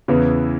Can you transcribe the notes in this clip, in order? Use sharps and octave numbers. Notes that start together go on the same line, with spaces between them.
E2 C#3 E3 B3 E4